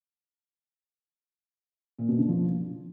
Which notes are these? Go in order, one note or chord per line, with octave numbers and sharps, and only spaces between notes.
A#2
B2
D3
F3